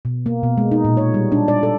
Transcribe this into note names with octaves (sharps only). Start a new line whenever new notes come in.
B2
A#3
B2
G#3
D#4
A#2
C#5
G3
D4
D5
A4